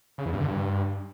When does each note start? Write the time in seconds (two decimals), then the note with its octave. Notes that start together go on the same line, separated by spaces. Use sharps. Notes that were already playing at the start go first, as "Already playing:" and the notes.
0.18 C#3
0.26 E2
0.33 G2
0.40 D3
0.48 G2